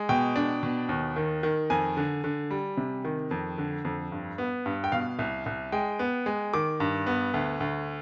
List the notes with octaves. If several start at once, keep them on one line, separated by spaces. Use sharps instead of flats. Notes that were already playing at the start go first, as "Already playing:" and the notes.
Already playing: G#3
B2 G5
D4
B2
D#2
D#3
D#3
F2 G#5
D3
D3
G3
C3
D#3
F2
D3
F2
G2
B3
G2
G5
B2 F5
C2
C2
G#3 G5
B3
G#3
D#3 D6
G2
B3
D2
D2